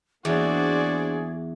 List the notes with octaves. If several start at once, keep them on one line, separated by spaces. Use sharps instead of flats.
E2 A#3 D4 F#4 G#4 C5 D5